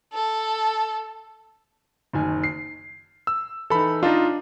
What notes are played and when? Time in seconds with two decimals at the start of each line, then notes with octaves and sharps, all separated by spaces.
0.13 A4
2.13 F#1 D#3 G#5
2.44 C7
3.27 E6
3.70 E3 D#4 A4 B5
4.03 D4 D#4 F4 D#5